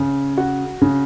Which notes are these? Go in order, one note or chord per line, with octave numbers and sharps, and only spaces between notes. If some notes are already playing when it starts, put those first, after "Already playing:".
Already playing: C#3
F#4
C#3